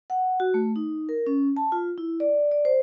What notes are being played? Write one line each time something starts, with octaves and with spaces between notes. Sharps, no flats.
F#5
F#4
A3
D#4
A#4
C#4
A5
F4
E4
D5
D5
C5